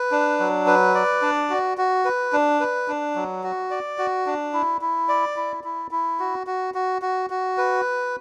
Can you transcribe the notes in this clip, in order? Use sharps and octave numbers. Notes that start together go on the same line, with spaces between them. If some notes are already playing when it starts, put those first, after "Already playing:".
Already playing: B4
D4
F#3
B4
D5
D4
F#4
F#4
B4
D4
B4
D4
F#3
F#4
D5
F#4
D4
E4
E4
D5
E4
E4
E4
F#4
F#4
F#4
F#4
F#4
B4